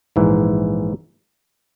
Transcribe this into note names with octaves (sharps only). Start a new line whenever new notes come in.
A#1 G#2 E3